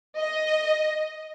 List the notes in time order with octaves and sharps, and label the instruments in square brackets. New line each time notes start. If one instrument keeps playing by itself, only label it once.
[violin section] D#5